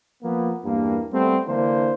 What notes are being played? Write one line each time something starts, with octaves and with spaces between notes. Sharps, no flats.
F3 A#3 B3
E2 G2 A#3
G3 A3 B3 C4
D3 E3 A#3 D4 C5